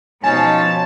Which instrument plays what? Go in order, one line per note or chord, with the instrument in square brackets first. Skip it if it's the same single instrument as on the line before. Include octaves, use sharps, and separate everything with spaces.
[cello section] B2 F3 [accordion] C#4 D#4 C#5 [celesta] G#5 [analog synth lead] A5